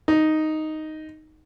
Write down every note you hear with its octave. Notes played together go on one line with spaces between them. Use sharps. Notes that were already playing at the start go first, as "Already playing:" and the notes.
D#4